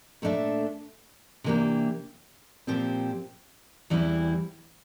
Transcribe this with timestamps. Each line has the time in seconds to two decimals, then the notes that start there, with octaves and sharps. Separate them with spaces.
0.22 A#2 A3 D4 A4 E5
1.44 C3 E3 A#3 D4 G4
2.67 A#2 F3 C4 G4 C5
3.90 E2 E3 G3 C4 E4